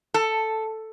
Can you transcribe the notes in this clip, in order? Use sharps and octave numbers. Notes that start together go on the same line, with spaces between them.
A4